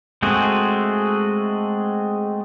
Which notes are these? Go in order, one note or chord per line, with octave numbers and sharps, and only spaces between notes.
G#3 A3 C4 F#4 G#4